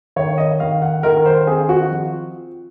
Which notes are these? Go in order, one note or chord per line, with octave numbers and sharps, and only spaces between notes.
D#3 C#5
D#5
D#3 F5
F#5
D#3 A#4
C5
C4 G#4
F#4
F3